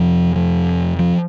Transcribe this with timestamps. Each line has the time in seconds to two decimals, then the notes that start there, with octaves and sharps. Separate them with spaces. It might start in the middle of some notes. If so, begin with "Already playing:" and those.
Already playing: F2 C3 F3
0.36 F3
0.99 F3